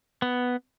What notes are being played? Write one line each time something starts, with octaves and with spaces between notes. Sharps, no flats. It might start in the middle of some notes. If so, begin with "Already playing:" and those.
B3